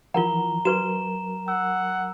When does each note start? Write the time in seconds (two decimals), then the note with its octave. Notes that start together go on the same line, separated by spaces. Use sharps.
0.14 E3 F3 F4 A#4 F#5 A#5 G7
0.65 F#3 F#4 A#4 B4 C#6 E7
1.48 F#5 E6